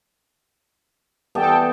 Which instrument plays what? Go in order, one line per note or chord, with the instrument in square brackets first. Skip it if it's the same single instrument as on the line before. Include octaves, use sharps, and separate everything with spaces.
[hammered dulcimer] E3 G3 B3 [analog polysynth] A4 G5 A5